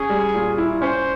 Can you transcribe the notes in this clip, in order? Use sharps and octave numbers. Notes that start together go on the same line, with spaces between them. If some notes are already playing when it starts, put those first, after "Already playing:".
Already playing: C#4 G#4
G3
A#2
E4
C#4 C5